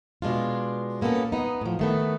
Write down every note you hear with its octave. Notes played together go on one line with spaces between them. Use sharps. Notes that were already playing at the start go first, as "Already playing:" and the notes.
B2 G#3 D4 F4
A#2 A#3 B3 C#4 A4
B3 D#4
A2 F3
D#3 A3 B3